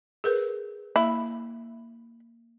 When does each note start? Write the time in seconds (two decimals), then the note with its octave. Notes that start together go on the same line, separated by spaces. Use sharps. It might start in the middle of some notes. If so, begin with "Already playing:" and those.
0.24 G#4 A#4 B4
0.96 A#3 E4